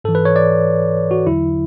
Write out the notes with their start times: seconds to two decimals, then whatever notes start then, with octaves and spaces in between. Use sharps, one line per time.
0.04 G#2 E3 A4
0.15 B4
0.25 C#5
0.36 D5
1.11 F#4
1.27 E2 D3 F#3 E4